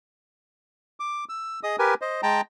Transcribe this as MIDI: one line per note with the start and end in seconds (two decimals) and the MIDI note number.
1.00 1.24 86
1.29 1.60 88
1.63 1.76 68
1.63 1.76 75
1.63 1.76 87
1.79 1.94 67
1.79 1.94 70
1.79 1.94 71
1.79 1.94 80
2.01 2.21 72
2.01 2.21 75
2.23 2.41 56
2.23 2.41 79
2.23 2.41 81
2.23 2.41 82